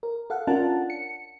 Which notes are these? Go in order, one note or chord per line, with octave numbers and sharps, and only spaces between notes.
A#4
A4 F5 F#5
C#4 D4 F4 A#4 F#5 A5
C#7